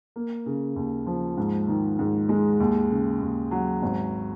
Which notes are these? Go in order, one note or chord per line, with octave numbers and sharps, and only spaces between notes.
A#3
C#3
D#2
F3
G#2
D#3
G#2
G#3
D#2
C#3
D#2
F#3
G#1